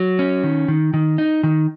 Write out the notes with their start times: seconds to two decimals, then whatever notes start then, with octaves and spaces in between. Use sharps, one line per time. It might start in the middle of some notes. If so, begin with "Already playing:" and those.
Already playing: F#3
0.19 C#4
0.44 D#3
0.68 D#3
0.94 D#3
1.18 D#4
1.43 D#3